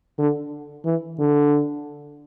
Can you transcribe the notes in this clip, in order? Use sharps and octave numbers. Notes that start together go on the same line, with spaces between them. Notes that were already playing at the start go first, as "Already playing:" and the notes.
D3
E3
D3